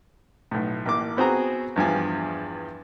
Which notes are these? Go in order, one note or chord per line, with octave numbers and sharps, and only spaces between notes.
B1 A2
A1 A#3 D6
B3 C4 F#4 G#4 A#5
E2 G2 F3 G#5